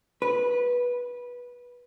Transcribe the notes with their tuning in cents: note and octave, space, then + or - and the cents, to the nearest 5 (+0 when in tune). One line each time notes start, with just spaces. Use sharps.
B4 -15